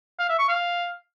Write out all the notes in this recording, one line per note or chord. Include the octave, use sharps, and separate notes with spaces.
F5
E5
C#6
F5